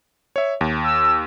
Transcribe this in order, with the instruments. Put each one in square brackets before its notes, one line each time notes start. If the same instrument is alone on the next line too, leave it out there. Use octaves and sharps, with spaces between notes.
[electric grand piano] C#5 E5
D#2
[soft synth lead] E6